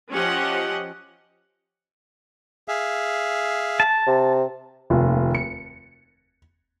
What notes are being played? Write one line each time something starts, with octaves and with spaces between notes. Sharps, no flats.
F3 C#4 G4 D#5 F#5
G#4 E5 F5
A5
C3
F1 D#2 F4
C#7